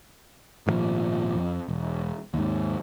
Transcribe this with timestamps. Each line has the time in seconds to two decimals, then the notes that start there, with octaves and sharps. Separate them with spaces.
0.67 G#1 G2 A#2 F3
1.36 F2
1.68 E1
2.34 D#2 G#2